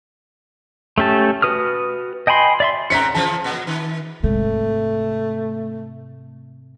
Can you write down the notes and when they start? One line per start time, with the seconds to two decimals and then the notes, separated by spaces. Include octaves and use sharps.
0.98 A3 C#4 G4 A5
1.42 F#4 B4 D#6 F6
2.27 D#5 G5 G#5 B5 C6
2.60 D5 E5 C6
2.90 G#2 C4 C#4 A#5 B6 C#7
3.15 C#3 E3 F3 A5
3.44 A#2
3.67 D#3
4.23 G#2 C3 A3